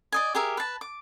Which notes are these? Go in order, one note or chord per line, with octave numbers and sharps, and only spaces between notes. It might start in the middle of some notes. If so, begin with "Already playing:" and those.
D5 D#5 G#5
G4 G#4 A#4 E5
B4 A5
D6